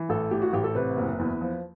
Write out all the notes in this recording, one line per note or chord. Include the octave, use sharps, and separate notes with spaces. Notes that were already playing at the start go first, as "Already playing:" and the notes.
Already playing: E3
A1 A4
A2 G4
F#4
A1 G4
A4
C3 B4
F#1
E2
F3